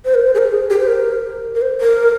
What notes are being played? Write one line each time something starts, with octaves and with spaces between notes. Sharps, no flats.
C5
A#4
C5
G#4
A#4
G#4
G4
C5
A#4
A#4
C5
A#4